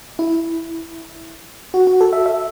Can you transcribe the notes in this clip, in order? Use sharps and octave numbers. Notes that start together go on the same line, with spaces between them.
E4
F#4
F#4
A4
E5
E5